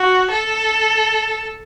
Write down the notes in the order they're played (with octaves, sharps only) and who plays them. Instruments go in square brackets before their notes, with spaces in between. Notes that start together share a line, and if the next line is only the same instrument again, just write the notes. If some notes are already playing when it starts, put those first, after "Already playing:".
Already playing: [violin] F#4
A4